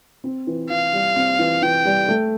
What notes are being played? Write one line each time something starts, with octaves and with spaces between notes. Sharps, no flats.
C4
E3
E3 F5
G3
C4
E3
E3 G5
G3
A3